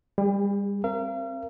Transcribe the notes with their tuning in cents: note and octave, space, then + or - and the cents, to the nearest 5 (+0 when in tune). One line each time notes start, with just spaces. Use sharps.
G3 +30 G#4 -40
C4 +20 A#4 +0 F5 -40